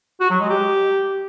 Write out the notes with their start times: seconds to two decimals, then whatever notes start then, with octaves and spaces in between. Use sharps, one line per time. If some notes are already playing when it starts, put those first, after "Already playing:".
0.20 F#4
0.30 F#3
0.40 G#3
0.50 G4